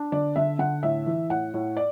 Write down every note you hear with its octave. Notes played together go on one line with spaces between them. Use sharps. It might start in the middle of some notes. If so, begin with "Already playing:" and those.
Already playing: D4
D3 D5
D3 E5
D3 F#5
A2 E5
E3
A2 F#5
A2
D5